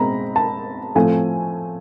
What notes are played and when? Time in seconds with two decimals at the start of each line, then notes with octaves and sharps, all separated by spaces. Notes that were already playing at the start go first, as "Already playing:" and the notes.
Already playing: B2 G#3 C4 A#5 B5
0.36 A5
0.95 A2 F3 A3 C4 G#5